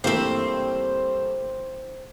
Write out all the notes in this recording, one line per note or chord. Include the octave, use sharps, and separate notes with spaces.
G2 E3 G3 A3 A#3 C4 C5 E5